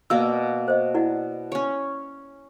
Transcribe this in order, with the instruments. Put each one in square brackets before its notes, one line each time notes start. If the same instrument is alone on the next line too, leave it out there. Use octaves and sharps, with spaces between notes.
[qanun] B2 A#3 [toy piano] D5 E6
[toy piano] C5 D#5
E4 D5 F#5
[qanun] C#4 C#5